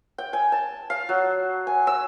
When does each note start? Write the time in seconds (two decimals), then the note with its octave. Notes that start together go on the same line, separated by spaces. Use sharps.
0.18 G5
0.33 G#5
0.52 A5
0.90 F5
1.09 F#3
1.67 G#5
1.87 E6